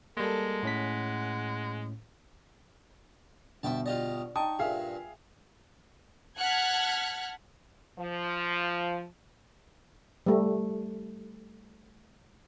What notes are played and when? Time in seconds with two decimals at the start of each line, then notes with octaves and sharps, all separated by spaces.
0.17 G3 G#3 A#3 A4 A#4
0.63 A2 C#4 F#5 B6
3.63 G1 B2 E5 G5 A5
3.86 F4 G4 D5 D#5
4.36 D#4 G5 A5 C#6 D#6
4.59 G2 A#2 G#4 E5 F5
6.37 F#5 A5 F6 F#6 G#6 B6
7.99 F3
10.26 G3 A3